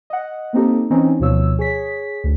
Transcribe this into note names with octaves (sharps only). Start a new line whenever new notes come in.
D#5 F#5
A#3 C4 D#4 G4 A4
E3 C4 C#4 D#4
D2 B2 F3 C#5 E6
G#4 C#5 B6
D2